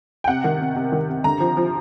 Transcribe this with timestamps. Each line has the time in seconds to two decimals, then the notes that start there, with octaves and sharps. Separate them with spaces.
0.24 G5
0.28 C3 F#5
0.44 D#3
0.61 C3
0.76 C3
0.92 D#3
1.09 C3
1.24 D3 A#5
1.40 F3
1.57 F3